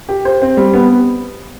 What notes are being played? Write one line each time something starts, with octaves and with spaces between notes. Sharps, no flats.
G4
C5
C4
G3
B3